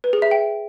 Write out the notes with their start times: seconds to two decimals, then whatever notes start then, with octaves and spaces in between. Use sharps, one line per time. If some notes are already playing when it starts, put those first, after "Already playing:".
0.04 B4
0.13 G#4
0.22 E5
0.31 G5